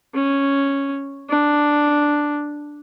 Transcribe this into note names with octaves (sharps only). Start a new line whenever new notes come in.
C#4
D4